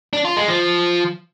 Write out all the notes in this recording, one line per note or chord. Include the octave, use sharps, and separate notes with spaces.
D4
F4
G#3
F3